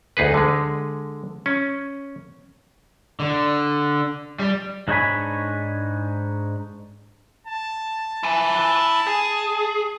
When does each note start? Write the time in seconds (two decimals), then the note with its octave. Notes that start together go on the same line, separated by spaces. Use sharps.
0.17 D2 D#4 G#4 B4
0.34 D3 G#3
1.46 C#4
3.20 D3
4.39 G3
4.88 G#2 D4 D#4 C#5 G#5 B5
7.47 A5
8.23 E4 G#5
9.07 G#4